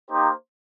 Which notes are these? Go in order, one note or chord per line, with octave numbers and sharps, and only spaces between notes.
A#3 D#4 G4 C5